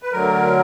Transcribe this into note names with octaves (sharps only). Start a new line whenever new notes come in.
B4
D2 D3 F#3 A#4